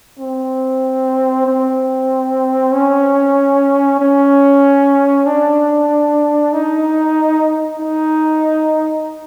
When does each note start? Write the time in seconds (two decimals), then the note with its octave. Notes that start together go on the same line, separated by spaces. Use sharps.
0.19 C4
1.46 C4
2.73 C#4
4.00 C#4
5.26 D4
6.53 D#4
7.80 D#4